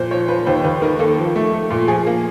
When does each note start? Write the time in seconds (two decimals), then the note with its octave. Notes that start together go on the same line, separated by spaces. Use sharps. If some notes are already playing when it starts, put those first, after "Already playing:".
Already playing: A#2 F3 A#4 C5
0.11 F3 C#5
0.28 F3 B4
0.46 D#2 C5
0.64 D#2 B4
0.82 D#3 A#4
0.99 A#3 A4
1.18 F3
1.36 A3
1.53 A3
1.70 A#2
1.88 F3 G#4
2.06 A#3